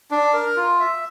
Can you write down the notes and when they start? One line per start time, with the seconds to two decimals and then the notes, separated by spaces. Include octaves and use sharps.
0.11 D4
0.34 A#4
0.57 F4
0.80 E5